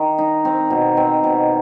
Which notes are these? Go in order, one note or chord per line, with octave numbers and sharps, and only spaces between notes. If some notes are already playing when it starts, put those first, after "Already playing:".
Already playing: D#3
D#4
C4
B2
C4
B2